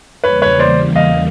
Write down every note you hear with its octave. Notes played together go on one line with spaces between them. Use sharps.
E2 C#3 E3 G3 A#3 B4 C#5
B4 C#5
C5 D5
D#5 F5